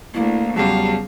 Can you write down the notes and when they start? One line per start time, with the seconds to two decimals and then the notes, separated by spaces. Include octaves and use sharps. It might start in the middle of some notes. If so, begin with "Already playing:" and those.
0.14 D2 A#3 E4
0.56 E2 C#3 F#3 G3 F5 A5